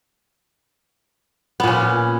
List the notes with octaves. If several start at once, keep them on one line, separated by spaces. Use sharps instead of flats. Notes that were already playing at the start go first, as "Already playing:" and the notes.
A#2 B3 C#4